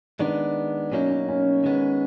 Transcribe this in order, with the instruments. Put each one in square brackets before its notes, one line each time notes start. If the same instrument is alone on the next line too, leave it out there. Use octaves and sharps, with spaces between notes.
[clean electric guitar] D#3 G#3 B3 [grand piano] D4
[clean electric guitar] B2 F#3 A#3 D#4 [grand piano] C#4
[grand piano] C#4
C#4
[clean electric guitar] D#3 G#3 B3